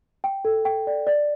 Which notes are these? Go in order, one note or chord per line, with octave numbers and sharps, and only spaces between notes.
G5
A4
G5
D5
D5